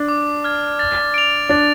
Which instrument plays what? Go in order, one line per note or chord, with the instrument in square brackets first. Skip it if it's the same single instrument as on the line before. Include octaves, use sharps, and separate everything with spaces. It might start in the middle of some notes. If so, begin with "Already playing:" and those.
Already playing: [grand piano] D4
[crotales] D6
F6 G#6
A6
D7 F7
[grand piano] D4 [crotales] A6